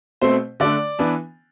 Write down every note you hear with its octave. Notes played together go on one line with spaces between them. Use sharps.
B2 A3 C4 C5
D3 A3 D4 D5
E3 B3 D4